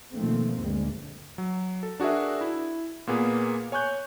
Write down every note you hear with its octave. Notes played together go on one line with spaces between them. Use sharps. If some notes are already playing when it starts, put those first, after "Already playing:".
B2 D#3 F3 A3 A#3 C4
D2 G2 A#2 G#3
F#3
A4
D4 F#4 G#4 A#4 E5
E4
A#2 A#3 B3 G#4
C#5 G#5 C#6 F#6 G6